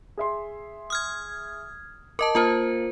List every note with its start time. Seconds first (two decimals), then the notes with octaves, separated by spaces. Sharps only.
0.17 G#4 E5 C6
0.90 D#6 F6 G#6
2.19 A#4 D#5 A5 D6
2.35 A#3 F4 A#4 C5 A5 F6